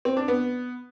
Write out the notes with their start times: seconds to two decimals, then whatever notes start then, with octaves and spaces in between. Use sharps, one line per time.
0.05 C4
0.17 D4
0.28 B3